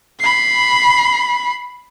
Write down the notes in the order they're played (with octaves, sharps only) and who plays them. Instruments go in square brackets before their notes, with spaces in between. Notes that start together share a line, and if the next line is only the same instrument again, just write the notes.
[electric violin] B5 C7